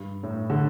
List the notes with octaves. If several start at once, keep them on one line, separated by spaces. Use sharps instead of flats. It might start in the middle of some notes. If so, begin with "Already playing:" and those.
Already playing: G2
A2
D3